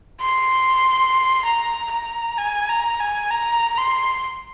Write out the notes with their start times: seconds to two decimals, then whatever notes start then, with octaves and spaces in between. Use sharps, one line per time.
0.21 C6
1.45 A#5
1.91 A#5
2.38 G#5
2.69 A#5
3.00 G#5
3.31 A#5
3.78 C6